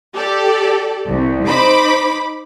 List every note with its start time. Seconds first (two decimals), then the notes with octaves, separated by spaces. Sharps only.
0.15 G4 A4 D5
1.07 C2
1.46 D#4 C5 B5 D6